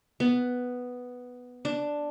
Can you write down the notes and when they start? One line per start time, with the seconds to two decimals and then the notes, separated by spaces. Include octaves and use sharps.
0.20 B3
1.65 D4